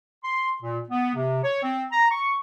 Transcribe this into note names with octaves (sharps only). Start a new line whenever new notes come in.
C6
A#2
B3
C3
C#5
C4
A#5
C#6